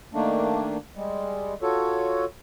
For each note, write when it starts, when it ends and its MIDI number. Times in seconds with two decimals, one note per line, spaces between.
0.14 0.77 51
0.14 0.77 57
0.14 0.77 58
0.14 0.77 62
0.96 1.54 55
0.96 1.54 56
1.62 2.25 65
1.62 2.25 66
1.62 2.25 69
1.62 2.25 73